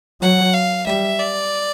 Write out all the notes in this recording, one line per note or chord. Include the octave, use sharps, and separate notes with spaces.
F#3 F#5
F5
G3 E5
D5